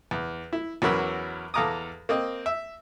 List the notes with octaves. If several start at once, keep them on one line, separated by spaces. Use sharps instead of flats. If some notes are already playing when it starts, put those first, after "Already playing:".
E2
E4
E2 F#3 C#4 A#4 B5 E6
E2 A4 F5 A#5 D6 D#6
A#3 C4 D#5
E5